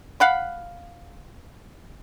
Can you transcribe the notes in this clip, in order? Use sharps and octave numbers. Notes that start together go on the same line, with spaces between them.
F5 F#5 B5